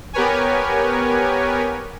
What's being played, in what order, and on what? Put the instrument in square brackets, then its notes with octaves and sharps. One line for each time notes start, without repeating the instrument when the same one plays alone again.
[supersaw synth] B3 G4 A#4 B4 C#5 G#5